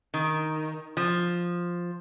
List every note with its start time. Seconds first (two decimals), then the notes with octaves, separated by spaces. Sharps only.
0.14 D#3
0.97 F3